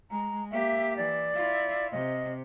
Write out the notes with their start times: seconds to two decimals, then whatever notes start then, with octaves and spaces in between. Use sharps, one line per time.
0.11 G#3 A#5
0.51 A#3 G4 E5
0.97 E3 D5
1.35 E4 F4
1.92 C3 D#5